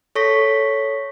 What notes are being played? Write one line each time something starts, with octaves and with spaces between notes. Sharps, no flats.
A4 C#5 C#6 A#6 B6